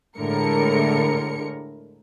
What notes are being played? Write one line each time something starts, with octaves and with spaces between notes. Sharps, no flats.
A2 D3 G#3 A#4 C#7